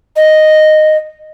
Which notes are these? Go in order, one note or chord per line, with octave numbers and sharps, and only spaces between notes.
D#5